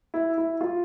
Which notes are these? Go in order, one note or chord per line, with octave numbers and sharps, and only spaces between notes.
E4
E4
F4